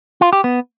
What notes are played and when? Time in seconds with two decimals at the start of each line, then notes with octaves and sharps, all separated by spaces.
0.21 F4
0.33 G4
0.44 B3